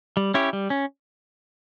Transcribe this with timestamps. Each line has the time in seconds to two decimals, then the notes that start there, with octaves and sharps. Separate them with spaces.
0.17 G3
0.34 C#4 E4 G4 C#5
0.53 G3
0.70 C#4